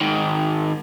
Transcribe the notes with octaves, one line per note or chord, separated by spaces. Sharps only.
G#2 D#3